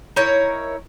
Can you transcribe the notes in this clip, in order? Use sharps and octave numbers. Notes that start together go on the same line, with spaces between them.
D#4 E4 A#4 C#5